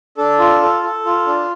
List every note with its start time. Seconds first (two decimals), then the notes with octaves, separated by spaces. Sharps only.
0.17 D4 A4
0.39 F4
0.62 A4
0.83 A4
1.05 F4
1.26 D4